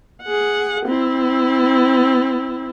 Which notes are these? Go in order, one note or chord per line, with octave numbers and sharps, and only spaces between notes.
G#4 F#5
C4 E4